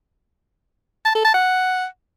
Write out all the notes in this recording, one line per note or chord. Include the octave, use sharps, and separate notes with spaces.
A5
A4
A5
F#5